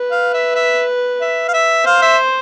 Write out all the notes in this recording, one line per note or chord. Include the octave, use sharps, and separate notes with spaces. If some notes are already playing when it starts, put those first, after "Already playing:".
Already playing: B4
F5
E5
E5
E5
F5
E5
C5 F5
E5